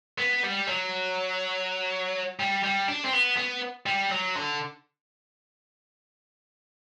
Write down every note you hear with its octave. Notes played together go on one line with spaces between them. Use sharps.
B3
G3
F#3
G3
G3
D4
C4
B3
B3
G3
F#3
D3